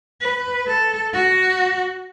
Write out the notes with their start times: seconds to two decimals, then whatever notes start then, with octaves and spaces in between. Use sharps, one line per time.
0.22 B4
0.67 A4
1.13 F#4